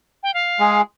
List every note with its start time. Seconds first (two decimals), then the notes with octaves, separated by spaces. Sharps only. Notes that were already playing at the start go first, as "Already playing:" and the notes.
0.23 G5
0.34 F5
0.59 G#3 G#4